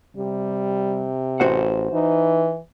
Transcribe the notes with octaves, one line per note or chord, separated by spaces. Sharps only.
C3 G3
A1 F#4 C5 F#5
E3 D#4